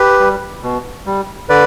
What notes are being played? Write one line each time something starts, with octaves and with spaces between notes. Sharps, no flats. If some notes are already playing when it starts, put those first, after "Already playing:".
Already playing: G4 B4
G3
B2
G3
D3 B4 D5